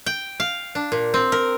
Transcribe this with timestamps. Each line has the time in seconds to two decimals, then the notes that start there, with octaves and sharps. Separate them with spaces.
0.06 G5
0.40 F5
0.75 D4
0.92 A#2
1.14 C4
1.32 A#4